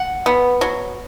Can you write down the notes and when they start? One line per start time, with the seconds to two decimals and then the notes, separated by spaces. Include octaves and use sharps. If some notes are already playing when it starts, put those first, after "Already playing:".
Already playing: F#5
0.26 B3
0.61 F#3